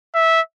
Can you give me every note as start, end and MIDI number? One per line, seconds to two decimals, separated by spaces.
0.15 0.41 76